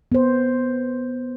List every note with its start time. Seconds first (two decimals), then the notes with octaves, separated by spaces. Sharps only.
0.12 B3 C5